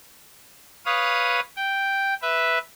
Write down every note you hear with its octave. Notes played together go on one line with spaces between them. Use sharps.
B4 C#5 F5 D#6
G5
B4 E5